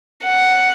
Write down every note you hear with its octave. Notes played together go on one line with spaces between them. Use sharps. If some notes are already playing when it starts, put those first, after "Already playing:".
F#5